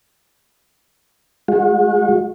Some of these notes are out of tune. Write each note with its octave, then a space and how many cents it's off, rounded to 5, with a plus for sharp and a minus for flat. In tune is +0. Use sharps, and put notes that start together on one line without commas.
G#3 +0 F#4 -40